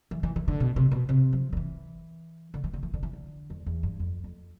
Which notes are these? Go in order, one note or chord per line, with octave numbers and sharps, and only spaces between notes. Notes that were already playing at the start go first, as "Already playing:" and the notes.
E3
E3
E3
D3
B2
C3
B2
C3
F3
D3
E3
D3
E3
D3
E3
D3
E3
D3
F2
E2
G2
F2
F2